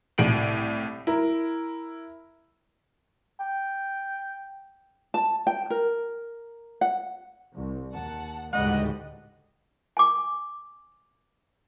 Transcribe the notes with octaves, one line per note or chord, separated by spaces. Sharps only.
C2 A2 D7 F#7
E4 A#4
G5
A5
G5
A#4
F#5
C2
D#2 F#5 A5
A1 D2 G#2 C#3 G3 D#5 F#5
G#5 D6